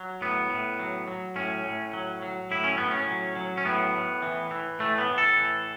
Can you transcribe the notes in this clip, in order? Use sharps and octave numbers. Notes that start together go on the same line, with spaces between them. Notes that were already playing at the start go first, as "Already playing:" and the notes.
Already playing: F#3
A2 B3
A2
F#3
F#3
A2 C#4
A2
F#3
F#3
A2 E4
C#4
A2 B3
C#4
F#3
F#3
C#4
A2 B3
A2
E3
E3
A2 A3
B3
A2
A4
E3